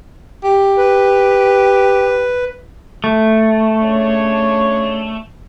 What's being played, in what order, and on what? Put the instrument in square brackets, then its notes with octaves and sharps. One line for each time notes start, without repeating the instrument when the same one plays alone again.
[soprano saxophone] G4
[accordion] B4
[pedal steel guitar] A3
[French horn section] C#3 D4 C#5